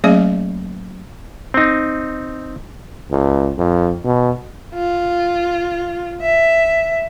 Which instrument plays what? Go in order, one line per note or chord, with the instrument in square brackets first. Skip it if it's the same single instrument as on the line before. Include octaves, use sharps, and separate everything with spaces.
[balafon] F#3 A3 A#3 C#4 G#4 D#5
[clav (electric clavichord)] C4 D#4
[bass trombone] C#2
F2
B2
[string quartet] F4
E5